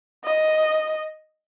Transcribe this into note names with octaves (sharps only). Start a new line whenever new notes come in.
D#5